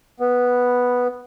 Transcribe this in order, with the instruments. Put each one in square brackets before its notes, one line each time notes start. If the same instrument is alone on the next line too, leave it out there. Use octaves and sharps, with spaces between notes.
[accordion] B3